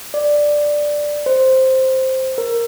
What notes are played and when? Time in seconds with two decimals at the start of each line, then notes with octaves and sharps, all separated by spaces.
0.14 D5
1.26 C5
2.38 A#4